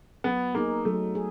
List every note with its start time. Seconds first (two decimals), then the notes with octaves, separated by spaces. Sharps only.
0.24 F#3 B3
0.54 A#3 B3 D#4 G#4
0.85 F#3 A3
1.15 G#4